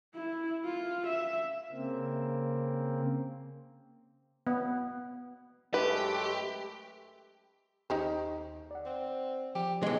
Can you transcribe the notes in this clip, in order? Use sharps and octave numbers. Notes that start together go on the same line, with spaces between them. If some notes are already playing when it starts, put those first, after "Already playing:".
E4
F4
E5
C#3 A#3 C4
B3
F#2 G#3 A3 G4 B4
D#2 D#4 G4 C5
D5 F#5
C4
F3 G4
B1 C#3 G#3